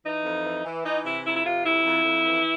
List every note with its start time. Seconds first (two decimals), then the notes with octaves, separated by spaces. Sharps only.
0.05 E3 D#4
0.25 F2
0.45 E3
0.65 E3
0.85 E3 D#4
1.05 C3 E4
1.25 F2 E4
1.36 E4
1.45 C3 F4
1.65 F2 E4
1.86 F2
2.05 F2
2.25 E3